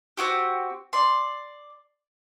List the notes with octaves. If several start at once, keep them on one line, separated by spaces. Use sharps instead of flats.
C4 E4 F#4 G4
D5 C6